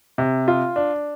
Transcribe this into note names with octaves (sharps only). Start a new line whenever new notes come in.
C3
F4
D4